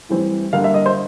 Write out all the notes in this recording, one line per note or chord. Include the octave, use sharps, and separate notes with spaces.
A2 E3 G3 C4
D3 G3 A#3 F5
E5
D#5
C5